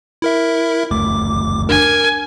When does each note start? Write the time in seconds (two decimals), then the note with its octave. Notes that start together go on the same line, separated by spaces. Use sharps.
0.22 E4 A#4 E5
0.91 F#1 D2 A3 D6
1.69 D4 A#4 G#5